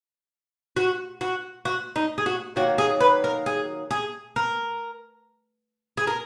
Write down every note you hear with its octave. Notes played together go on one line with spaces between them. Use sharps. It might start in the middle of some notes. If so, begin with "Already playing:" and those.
F#4
F#4
F#4
D#4
G#4
F#4
D#3 F#3 A#3 F#4
G#4
B4
A#4
G#4
G#4
A#4
G#4
A#4